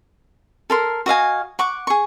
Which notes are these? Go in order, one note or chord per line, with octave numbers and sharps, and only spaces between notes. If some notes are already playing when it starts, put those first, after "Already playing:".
A4 A#4 C6
F#4 D#5 F5 G#5
F#5 C#6 D6
G#4 C#6